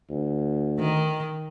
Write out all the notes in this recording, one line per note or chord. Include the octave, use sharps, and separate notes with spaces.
D2
D#3